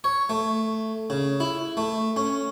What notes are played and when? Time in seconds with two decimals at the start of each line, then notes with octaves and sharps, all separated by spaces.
0.04 C#5
0.29 A3
1.10 C#3
1.40 E4
1.77 A3
2.16 C#4